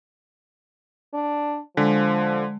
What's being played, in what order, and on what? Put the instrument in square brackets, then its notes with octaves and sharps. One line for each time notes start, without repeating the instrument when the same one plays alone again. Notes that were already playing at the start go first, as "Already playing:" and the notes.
[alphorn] D4
[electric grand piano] D3 [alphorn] F3 [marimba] G#3